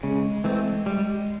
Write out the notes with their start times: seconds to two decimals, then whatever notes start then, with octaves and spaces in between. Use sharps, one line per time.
0.03 C#3 G#3
0.44 E3 G#3 A3 C4
0.86 G3 G#3